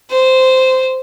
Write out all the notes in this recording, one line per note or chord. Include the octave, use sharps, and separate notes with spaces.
C5